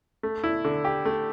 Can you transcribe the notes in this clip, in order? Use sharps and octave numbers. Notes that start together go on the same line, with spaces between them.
A3
E4
D3
G4
A3